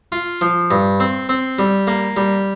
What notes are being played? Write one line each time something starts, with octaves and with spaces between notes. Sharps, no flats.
F4
F3
G2
C4
C4
G3
A#3
G3